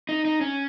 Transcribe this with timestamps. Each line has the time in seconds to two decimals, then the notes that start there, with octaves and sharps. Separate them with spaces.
0.09 D#4
0.25 D#4
0.41 C#4